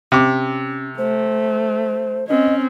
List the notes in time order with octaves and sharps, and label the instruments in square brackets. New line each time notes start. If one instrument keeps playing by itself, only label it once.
[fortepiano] C3 D6 [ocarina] C#4
[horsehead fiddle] A3 [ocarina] C5
[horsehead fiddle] C4 C#4 [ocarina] D#5